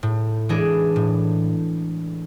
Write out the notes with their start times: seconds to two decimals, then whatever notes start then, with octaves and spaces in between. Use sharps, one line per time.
0.03 A2
0.49 E3 G#3 D4 G#4
0.96 A2